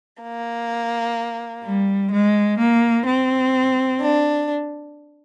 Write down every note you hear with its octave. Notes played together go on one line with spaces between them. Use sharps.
A#3
G3
G#3
A#3
C4
D4